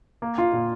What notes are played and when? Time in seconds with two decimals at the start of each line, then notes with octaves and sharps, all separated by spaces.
0.22 A#3
0.38 F4
0.53 A#2